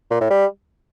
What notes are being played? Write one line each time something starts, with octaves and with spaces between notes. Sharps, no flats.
A#2
A2
G3